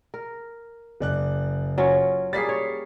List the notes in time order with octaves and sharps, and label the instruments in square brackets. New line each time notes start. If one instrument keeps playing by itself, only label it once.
[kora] A#4
[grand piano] F#1 D5 F#6
[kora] F#3 C#4 F4
[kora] G3 A#3 G#4 [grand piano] A6 B6 C7
[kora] C#5